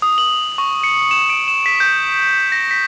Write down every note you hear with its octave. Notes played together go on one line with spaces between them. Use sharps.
D#6
F#7
C#6
C#7
E7
D7
E7
B6
G6
A#6
B6